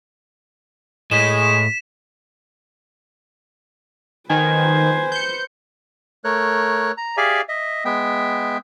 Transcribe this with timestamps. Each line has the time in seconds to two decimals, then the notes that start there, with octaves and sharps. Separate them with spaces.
1.11 A2 G#3 B6 E7
4.30 D#3 B4 C5 G#5
5.12 G6 C#7
6.24 A3 A#4 C#5 F#6
6.97 A#5
7.17 G4 G#4 D5 E5 F5 G#5
7.49 D#5 E5
7.85 G#3 B3 E5 G5